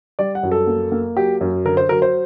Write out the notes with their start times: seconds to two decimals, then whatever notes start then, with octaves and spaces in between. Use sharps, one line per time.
0.19 G3 D5
0.35 F#5
0.43 F#2
0.52 A4
0.67 A#3
0.92 A#3
1.16 F#3 G4
1.41 F#2
1.65 D3 A#4
1.77 C5
1.89 F#3 A#4
2.02 C5